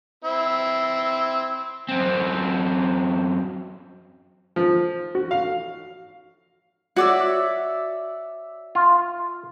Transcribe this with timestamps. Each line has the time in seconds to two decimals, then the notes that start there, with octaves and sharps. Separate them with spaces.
0.24 C4 E4
1.89 F#2 C4
4.56 F3
5.15 F#4
5.31 F5
6.96 F#4 C#5 D5 E5
8.75 F4